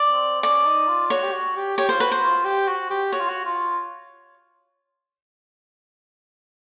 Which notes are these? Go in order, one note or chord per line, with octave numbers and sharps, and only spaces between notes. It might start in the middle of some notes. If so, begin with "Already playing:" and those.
Already playing: D5
C4
C#4 D5
D#4
F4
F#4 C#5
G4
F#4
G4
G4 C#5
F4 C5
F#4 B4
C5
F4
G4
F#4
G4
F#4 C#5
F4
F#4
F4